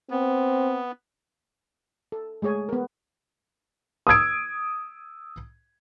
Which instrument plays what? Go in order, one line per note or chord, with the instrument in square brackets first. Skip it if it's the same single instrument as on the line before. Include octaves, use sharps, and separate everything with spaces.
[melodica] B3 [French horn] C4
[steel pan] A4
G#3 A3 G#4 C#5 G#5
B3 A#4
[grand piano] D#6 E6 G#6 D7